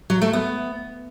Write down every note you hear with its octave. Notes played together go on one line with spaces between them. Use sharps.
F#3
A3
B3